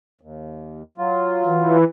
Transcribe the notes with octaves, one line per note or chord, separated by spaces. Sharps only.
D#2
F#3 F4
E3